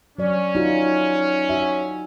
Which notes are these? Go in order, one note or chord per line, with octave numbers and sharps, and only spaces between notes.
F#3 C#4 D5
D#4 F4 F#4
F#4 E5